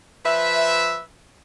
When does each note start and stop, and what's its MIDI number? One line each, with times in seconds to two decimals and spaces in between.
0.25 1.01 53
0.25 1.01 71
0.25 1.01 76